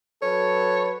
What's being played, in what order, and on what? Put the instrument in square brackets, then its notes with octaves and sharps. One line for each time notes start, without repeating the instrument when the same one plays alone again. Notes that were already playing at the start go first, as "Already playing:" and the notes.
[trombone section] F#3 A4 B4 [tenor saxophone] C#5